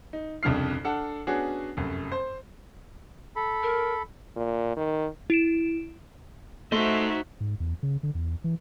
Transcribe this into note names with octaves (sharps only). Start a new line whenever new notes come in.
D#4
C2 F2 C#3 D4 F6 C7
D4 A4 F#5
B3 C#4 D4 F#4 G#4
F1 F#2
C5
A4 B5
A#4
A#2
D#3
E4 D7 E7
A3 D#4 F#4 C5 E5 C6
G#2
E2
C#3
D3
E2
E3